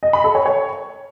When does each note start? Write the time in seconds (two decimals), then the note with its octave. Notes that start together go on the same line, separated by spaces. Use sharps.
0.03 D#5
0.13 B5
0.24 A4
0.35 C#5
0.46 C#5